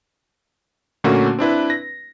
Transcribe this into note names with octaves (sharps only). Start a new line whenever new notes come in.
A#2 D3 A3 A#3 C#4 F#4
C4 D4 E4 B4
A#6